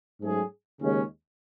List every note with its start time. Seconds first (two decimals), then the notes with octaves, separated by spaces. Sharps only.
0.21 G#2 F#3 A3 C#4 G#4
0.82 D#2 C#3 G#3 C#4